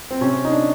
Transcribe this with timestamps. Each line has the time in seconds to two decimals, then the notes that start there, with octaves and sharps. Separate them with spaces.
0.11 C4
0.21 C3 C#4
0.45 D#4
0.52 D4